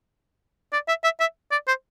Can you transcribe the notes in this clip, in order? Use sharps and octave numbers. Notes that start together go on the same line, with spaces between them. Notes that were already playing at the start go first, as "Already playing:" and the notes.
D5
E5
E5
E5
D5
C5